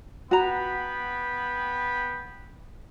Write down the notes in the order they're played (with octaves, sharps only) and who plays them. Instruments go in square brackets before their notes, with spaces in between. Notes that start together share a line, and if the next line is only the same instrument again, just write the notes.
[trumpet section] B3 G5 B5 [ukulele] F#4 A#5